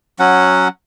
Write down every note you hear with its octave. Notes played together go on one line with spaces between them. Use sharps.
F#3 C#4 F#5